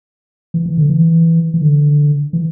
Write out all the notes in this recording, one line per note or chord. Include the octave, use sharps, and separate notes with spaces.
E3
E3
D3
E3
E3
D3
E3